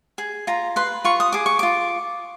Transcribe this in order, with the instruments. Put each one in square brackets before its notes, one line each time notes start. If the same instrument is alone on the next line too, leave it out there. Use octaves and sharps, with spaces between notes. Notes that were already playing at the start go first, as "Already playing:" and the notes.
[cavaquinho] G#4
F4 A#5
B4 C6
F4 C#6
D#6
G#4 D6
C#6
F4 D6